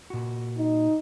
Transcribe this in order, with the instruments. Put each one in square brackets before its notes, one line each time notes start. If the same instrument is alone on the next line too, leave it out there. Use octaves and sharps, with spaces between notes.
[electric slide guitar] A#2 F#4
[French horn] D#4